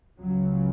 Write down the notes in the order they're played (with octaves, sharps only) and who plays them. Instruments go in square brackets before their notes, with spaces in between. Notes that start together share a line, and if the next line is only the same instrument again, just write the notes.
[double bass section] C#2 C#3 F#3